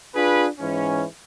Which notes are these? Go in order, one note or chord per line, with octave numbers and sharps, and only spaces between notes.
D4 F4 G#4 B4
G#2 E3 C#4